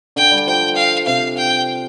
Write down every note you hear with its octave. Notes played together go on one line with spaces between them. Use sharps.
D3 G5
G3
F3 G5
F5
C3 F5
G5